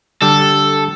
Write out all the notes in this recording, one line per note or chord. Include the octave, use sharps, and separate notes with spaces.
D3 G3 A4